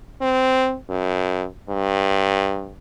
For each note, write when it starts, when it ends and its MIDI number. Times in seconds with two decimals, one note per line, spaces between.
0.21 0.75 60
0.90 1.45 42
1.69 2.73 43